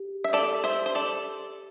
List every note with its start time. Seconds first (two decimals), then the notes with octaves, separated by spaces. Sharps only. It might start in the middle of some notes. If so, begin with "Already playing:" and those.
Already playing: G4
0.24 E5
0.33 A4 D5
0.64 C5 E5
0.86 C5
0.95 A4 D5